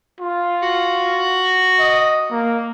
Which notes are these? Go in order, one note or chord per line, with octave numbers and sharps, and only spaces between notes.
F4
F#4
D#5
A#3